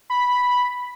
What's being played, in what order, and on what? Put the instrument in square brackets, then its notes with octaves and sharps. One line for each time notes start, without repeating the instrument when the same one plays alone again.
[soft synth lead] B5